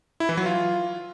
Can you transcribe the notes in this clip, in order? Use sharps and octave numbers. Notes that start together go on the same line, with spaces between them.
E4
E3
F#3
F4